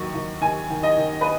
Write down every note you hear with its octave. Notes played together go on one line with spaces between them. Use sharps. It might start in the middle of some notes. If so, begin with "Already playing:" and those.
Already playing: D#2 F#3 C#6
D#2
D#2 G#5
D#3
D#5
D#3
B4